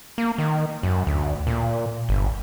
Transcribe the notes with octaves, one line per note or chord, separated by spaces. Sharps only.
A#3
D#3
F#2
D2
A#2
G1